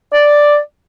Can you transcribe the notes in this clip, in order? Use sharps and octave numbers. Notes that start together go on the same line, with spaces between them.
D5